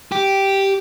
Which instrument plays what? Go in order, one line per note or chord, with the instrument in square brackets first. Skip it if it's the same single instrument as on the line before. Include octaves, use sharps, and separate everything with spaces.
[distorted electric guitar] G4